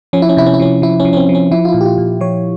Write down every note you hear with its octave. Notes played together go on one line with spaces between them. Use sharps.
F3 C#4
E4
C#4
C3 E4
C#4
E4
F3 C#4
F3 E4
C#4
F3
C#4
C4
F3
C#4
F3 E4
F4
E4
A#2
G4
F4
A#2
F3 C#5